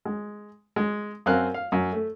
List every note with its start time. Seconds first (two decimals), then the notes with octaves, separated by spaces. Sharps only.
0.05 G#3
0.76 G#3
1.26 F#2 C4 A#4 F5 F#6
1.54 F5
1.72 F#2
1.93 A3